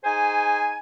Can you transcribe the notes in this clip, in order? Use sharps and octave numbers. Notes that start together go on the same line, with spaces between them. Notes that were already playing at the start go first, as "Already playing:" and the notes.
D#4 G#4 C5 G#5